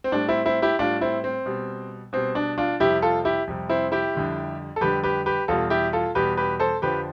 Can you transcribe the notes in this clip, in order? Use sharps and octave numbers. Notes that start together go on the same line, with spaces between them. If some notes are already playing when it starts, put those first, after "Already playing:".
C4
A2 G3 D4
C4 E4
C4 E4
E4 G4
A2 G3 D4 F4
C4 E4
C4
B2 G3
B2 G3 C4
D4
D4 F4
F2 C3 G3 E4 G4
F4 A4
E4 G4
F2 C3 G3
C4 E4
E4 G4
F2 D3 G3
A4
F2 D3 G3 G4 B4
G4 B4
G4 B4
E2 B2 G3 F4 A4
E4 G4
F4 A4
E2 B2 G3 G4 B4
G4 B4
A4 C5
F2 D3 F3 G4 B4